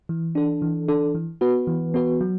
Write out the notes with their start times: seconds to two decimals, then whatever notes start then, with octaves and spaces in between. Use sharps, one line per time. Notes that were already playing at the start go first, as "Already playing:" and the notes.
0.09 E3
0.35 D4 A4
0.62 E3
0.88 D4 A4
1.15 E3
1.41 B3 F#4 B4
1.67 E3
1.94 B3 F#4 B4
2.21 F#3